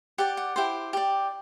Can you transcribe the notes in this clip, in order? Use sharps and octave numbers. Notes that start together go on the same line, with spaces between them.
G4 D5 F#5
F#5
E4 G4 C5
G4 D5 G5